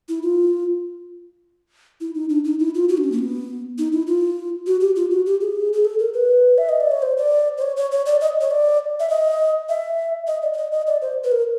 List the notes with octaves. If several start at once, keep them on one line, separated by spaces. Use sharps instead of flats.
E4
F4
E4
D#4
D4
D#4
E4
F4
F#4
D4
C#4
A#3
B3
D#4
E4
F4
F#4
G4
F4
F#4
G4
G#4
G#4
A4
A#4
B4
E5
D#5
D5
C#5
C5
D5
C5
C#5
C#5
C#5
D5
D#5
C#5
D5
E5
D#5
E5
D#5
D5
D5
D#5
D#5
D5
C5
B4
A#4